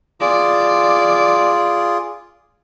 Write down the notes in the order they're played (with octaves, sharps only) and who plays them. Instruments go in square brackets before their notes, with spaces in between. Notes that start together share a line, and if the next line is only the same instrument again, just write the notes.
[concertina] F4 G#4 [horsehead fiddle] D5